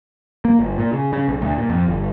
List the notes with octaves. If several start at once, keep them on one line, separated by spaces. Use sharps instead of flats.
A#3
G1
A#2
C#3
C#3
B1
D2
A#2
F2
G1